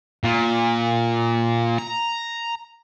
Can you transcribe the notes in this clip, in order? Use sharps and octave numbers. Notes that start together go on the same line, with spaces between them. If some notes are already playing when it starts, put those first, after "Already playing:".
A#2
A#5